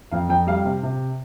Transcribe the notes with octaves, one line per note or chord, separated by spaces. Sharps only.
F2 F5
F2 G5
G3 F5
C3
C3